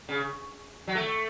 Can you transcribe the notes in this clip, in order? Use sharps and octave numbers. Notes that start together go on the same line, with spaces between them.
C#3
F#3
A3